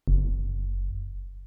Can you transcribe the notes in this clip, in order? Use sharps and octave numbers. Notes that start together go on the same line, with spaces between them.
F#1